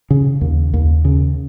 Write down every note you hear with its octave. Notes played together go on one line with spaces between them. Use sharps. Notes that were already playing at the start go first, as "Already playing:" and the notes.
C#3
D#2
D#2
C#3